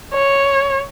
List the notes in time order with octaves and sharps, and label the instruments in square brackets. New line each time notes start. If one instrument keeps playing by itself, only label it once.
[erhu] C#5